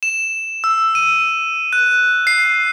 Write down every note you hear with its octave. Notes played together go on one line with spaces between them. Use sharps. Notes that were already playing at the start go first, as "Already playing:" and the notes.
E7
E6
D#7
F#6
C7